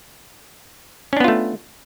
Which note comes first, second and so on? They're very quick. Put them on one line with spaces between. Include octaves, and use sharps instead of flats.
C#4 D4 B3 F4 A3